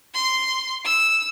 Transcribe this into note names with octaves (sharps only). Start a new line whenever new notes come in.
C6
E6